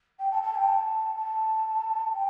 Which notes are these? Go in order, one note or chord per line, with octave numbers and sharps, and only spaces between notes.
G5
A5
A5
G5
A5
A5
G5